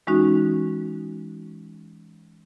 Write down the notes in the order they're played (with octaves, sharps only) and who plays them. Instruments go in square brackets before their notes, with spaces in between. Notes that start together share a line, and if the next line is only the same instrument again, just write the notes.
[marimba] E3 G#3 C#4 D#4 F#4